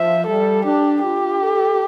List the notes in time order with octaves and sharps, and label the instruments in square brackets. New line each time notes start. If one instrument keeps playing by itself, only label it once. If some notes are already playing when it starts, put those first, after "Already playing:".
Already playing: [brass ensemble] F3 [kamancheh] E5
[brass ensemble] G3 [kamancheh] A4
[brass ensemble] D4 [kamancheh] G4
[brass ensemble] F4 [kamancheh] G4
[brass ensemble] A4